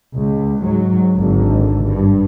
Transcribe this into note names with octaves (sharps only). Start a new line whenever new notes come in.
C#2
G#2 F#3
G#1 D3
G2